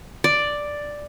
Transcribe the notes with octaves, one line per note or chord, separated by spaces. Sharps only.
D5